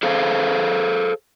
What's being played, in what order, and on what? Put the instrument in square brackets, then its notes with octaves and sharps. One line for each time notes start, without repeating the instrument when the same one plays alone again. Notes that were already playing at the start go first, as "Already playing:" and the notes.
[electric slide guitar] G#4 A4 C5 F5